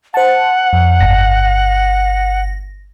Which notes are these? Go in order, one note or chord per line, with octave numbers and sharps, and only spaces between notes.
C5 F#5 A5
F2
G1 A#6